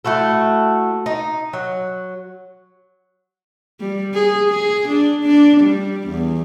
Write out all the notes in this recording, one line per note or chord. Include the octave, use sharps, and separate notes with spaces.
A3 E4 F#4 A4
D#4
F#3
G3
G#4
G#4
D4
D4
G3
E2